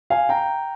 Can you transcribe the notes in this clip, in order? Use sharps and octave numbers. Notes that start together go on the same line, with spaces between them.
F5 G#5
G5 A#5